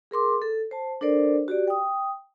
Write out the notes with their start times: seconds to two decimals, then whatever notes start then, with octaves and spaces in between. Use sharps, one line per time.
0.11 G#4 A#4 C6 D6
0.42 A4
0.71 C5 A5
1.01 D4 A4 A#4 C5 D5
1.48 F#4 G4 D5
1.68 G5 D#6